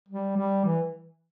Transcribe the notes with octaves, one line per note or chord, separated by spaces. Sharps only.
G3
G3
E3